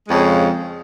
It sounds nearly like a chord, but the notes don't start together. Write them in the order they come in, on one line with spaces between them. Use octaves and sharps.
G#3 F2 C#3